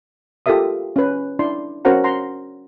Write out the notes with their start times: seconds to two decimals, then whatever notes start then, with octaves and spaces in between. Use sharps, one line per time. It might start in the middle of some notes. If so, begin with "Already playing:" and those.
0.46 F4 G4 A4 A#4 E5 D#6
0.96 C#4 B4
1.39 D4 E4 D5 C6
1.85 C#4 F#4 A#4 C5 F#5 A#5
2.04 F#5 A#5 C6